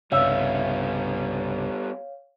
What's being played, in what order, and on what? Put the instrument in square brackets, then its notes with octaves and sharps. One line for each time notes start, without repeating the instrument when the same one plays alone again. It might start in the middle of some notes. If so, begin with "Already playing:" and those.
[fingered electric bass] C2 G2 C#3 [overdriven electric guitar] G3 B3 [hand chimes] C#5 F5 [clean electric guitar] E5